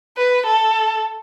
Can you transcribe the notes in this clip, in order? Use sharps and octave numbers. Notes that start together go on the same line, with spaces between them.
B4
A4